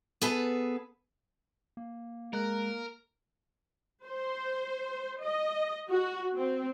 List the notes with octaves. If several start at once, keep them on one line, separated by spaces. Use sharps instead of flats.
B3 G#4 A4 B4
A#3
G#3 A#4 F#6
C5
D#5
F#4
C4